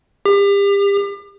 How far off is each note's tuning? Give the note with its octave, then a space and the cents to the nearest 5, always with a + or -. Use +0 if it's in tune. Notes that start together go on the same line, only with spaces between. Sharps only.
G4 +35